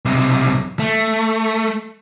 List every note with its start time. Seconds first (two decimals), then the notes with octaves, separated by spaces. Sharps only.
0.05 B1 C3
0.80 A3